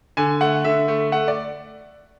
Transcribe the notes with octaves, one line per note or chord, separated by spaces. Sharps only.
D3 G#5
A3 F#5
D3 E5
A3
A3 F#5
D5